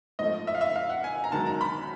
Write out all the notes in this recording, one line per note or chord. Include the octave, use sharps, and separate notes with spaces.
G#2 F3 A3 D#5
E5
F5
E5
F5
F#5
G#5
A#5
F#2 D#3 G#3 A5
A#5
B5